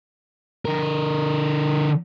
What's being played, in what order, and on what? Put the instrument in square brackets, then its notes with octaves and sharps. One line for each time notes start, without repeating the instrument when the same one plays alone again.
[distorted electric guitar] D3 A#4